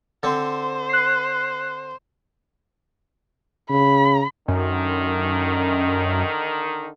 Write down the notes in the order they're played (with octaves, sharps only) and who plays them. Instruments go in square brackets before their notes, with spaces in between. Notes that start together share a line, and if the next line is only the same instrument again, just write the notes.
[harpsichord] D3 C4 [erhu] C5
[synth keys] F#6 C7
[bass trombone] C#3 [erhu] B5
[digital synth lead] F#2 [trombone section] D3 D#3